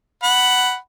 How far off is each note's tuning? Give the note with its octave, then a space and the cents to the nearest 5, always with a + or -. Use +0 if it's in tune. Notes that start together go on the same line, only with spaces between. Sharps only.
F#5 +10 B5 +0